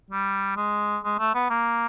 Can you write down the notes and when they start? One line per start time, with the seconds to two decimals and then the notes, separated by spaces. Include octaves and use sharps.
0.10 G3
0.57 G#3
1.04 G#3
1.19 A3
1.35 B3
1.50 A#3